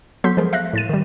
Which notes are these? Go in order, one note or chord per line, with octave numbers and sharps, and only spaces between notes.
F#3 B3 A4 C6 G6 B6
F3 G#3 G#4 A#4
E5 F5 F#6 A#6
A2 A6 D#7
D#3 G3